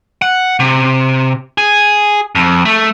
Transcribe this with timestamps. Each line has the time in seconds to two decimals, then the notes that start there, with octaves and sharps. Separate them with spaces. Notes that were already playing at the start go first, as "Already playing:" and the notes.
0.22 F#5
0.60 C3
1.58 G#4
2.35 F2
2.65 A3